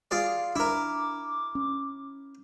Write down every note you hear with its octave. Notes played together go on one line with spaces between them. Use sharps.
F4 G#4 D5
D4 E4 A#4 D6
C#4